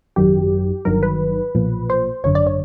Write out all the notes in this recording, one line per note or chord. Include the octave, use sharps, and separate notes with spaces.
G#1 F#2 D#3 F#3 G4
G1 G2 D#3 F#3 A#4
B4
B1 A#2 F3
C5
G#1 F#2 D3 C#5
D5
C#5